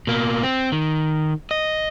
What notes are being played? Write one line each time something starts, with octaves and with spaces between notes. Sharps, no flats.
B2 A#3
C4
D#3
D#5